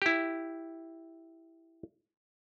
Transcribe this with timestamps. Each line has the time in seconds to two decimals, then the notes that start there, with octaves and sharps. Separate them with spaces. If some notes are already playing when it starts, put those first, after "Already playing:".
0.02 E4 G4